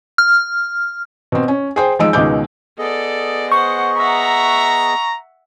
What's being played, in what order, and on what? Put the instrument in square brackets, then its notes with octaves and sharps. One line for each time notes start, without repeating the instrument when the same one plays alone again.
[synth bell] F6
[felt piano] B2 C4
C#4
G#4 C5 G5
F3 G#3 D#4 E6 D7
C#2 B2 D#3 G#3 D6 G6
[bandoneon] B3 G#4 D#5 [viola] A4 D5
[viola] C5 F#5 [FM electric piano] C#6
[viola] E5 F#5 [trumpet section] A#5